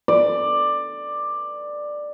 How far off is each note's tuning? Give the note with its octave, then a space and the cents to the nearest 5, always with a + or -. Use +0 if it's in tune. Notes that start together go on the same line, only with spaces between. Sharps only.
D5 +10